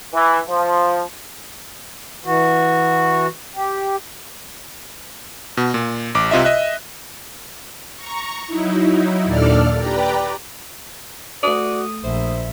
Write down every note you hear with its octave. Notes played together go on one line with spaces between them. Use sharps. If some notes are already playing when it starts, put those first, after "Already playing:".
E3
F3
E3 F#4
G4
B2
A#2
A1 D6
C2 C3 F4 D#5 E5
D#5 E5 F#6
A#5 C#6
F#3 D#4 E4
D#2 A#2 D4 A4 D5 F6
G4 B4 D5 G5 A#5
A3 F#4 D5 D#6
A#1 C5 E5